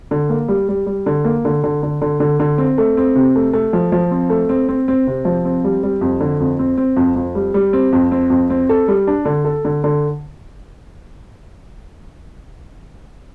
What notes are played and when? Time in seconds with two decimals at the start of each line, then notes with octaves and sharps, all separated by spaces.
0.11 D3
0.29 A#3
0.48 G3
0.69 G3
0.86 G3
1.06 D3
1.25 A#3
1.45 D3
1.64 D3
1.83 D3
2.01 D3
2.20 D3
2.40 D3
2.58 C4
2.78 A3
2.97 C4
3.15 C3
3.35 A3
3.53 A3
3.73 F3
3.92 F3
4.11 C4
4.30 A3
4.49 C4
4.69 C4
4.88 C4
5.07 C3
5.25 F3
5.45 C4
5.64 G3
5.83 G3
6.01 F2
6.20 D3
6.40 F2
6.59 C4
6.77 C4
6.97 F2
7.16 F2
7.35 G3
7.54 G3
7.73 C4
7.93 F2
8.12 C4
8.30 F2
8.50 C4
8.69 A4
8.88 G3
9.07 D4
9.25 D3
9.45 A4
9.65 D3
9.84 D3